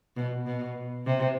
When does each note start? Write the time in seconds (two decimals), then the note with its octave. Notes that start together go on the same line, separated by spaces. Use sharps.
0.16 B2
0.46 B2
1.06 C3